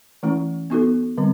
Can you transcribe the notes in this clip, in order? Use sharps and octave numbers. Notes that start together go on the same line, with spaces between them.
E3 A3 C#4 E4
B3 D#4 F#4 A4
D3 G3 C4